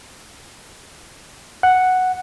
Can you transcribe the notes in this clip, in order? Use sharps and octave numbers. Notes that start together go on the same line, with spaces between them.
F#5